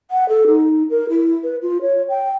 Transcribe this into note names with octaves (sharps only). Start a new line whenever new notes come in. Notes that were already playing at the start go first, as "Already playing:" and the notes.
F#5
A4
D#4
A#4
E4
B4
F4
C#5
G5